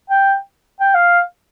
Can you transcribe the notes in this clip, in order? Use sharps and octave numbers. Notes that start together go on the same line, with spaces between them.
G5
G5
F5